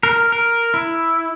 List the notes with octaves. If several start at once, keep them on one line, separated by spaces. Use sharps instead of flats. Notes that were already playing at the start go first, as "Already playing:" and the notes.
A#4
A#4
E4